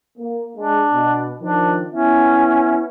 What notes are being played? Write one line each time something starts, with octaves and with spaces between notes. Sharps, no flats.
A#3
G#3 D4
B2
D#3 F3 D4
B3 C#4 E4 E5